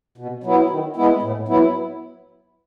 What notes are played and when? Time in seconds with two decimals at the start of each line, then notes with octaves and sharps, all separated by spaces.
0.18 B2
0.44 F#3 B3 E4
0.70 D#3
0.96 G#3 B3 E4
1.22 A2
1.48 F#3 B3 E4